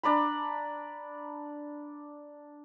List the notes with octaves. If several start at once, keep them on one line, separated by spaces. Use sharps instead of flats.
D4 D5 A#5 B5